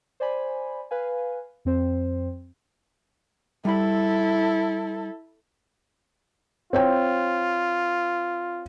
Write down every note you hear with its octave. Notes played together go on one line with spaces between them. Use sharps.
C5 D5 G#5 B5
B4 F5 G#5
F2 C4 C5
G3 E4 A4 B5
C4 F4 C#5 G5